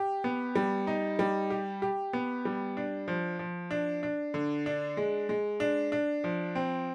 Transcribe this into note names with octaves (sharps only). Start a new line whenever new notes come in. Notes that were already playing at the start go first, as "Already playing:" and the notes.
Already playing: G4
B3
G3
D#4
G3
G4
G4
B3
G3
D4
F3
F3
D4
D4
D3
D4
G#3
G#3
D4
D4
F3
C4